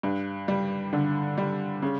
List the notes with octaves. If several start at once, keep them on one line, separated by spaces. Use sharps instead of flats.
G2
G3
D3
G3
C#3